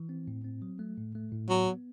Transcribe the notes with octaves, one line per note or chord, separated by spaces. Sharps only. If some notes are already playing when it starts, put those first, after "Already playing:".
Already playing: E3
C4
A2
C4
F#3
A3
A2
A3
A2
F#3 B3
B3